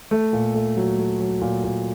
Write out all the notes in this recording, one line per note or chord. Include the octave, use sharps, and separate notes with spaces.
A3
A#2
A3
F#3
A3
F#3
A#2
A#2